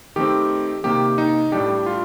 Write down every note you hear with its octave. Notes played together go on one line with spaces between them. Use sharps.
D#3 A3 C4 G4
C3 D#3 A#3 G4
D#4
A2 G3 D4 G4
F4